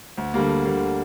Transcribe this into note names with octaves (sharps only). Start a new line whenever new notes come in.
D2
D3 G3 A#3
D2
D3 G3 A#3